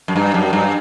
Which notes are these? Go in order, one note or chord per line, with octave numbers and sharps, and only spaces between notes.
F#2
G2
F#2
G2